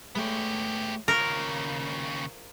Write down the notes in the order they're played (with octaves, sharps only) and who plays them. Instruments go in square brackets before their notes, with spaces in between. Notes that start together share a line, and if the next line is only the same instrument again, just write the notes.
[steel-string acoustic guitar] G#3 A3 C#5 [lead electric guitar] B3 G4
[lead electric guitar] D#2 C#3 [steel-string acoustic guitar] F4 C5 [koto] A#4